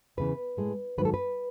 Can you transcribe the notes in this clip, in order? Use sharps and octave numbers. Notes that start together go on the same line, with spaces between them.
E2 C#3 E3 B4
A2 G#3
G#2 D#3 F#3 B4
A4
B4